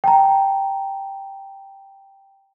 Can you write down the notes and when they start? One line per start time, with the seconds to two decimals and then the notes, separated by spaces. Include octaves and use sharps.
0.04 G5 A5 A#5